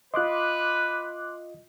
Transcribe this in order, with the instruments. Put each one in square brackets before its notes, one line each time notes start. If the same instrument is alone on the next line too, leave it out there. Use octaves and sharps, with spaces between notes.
[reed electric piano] F4 D#5 [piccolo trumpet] B4 [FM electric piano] C6 D6 F#6